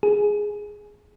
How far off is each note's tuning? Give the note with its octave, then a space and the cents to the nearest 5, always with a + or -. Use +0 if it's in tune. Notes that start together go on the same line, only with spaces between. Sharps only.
G#4 +0